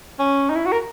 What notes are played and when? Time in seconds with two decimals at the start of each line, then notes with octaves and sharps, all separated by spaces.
0.19 C#4
0.50 D#4
0.55 E4
0.66 F#4
0.72 A#4